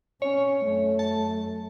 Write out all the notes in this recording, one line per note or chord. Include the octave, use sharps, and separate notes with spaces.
C#4 C#5
F#2 A3
A5